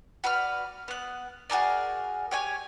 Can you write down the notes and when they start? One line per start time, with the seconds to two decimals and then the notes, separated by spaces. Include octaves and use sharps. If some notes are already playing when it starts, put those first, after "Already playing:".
0.24 F#4 B4 D5 F6
0.88 B3 F#6
1.50 F#4 G#4 A#4 D5
2.31 G4 C#5 G#5